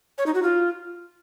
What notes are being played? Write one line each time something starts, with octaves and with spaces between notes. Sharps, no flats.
C#5
D#4
F#4
F4